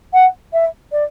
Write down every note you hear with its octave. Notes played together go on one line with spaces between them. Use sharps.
F#5
E5
D5